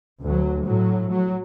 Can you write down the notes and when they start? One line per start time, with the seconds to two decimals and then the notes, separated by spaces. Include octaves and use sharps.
0.24 D2 F#3
0.66 A2 F#3
1.10 F#3